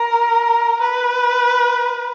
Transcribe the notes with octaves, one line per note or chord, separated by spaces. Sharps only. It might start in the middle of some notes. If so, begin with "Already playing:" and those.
Already playing: A#4
B4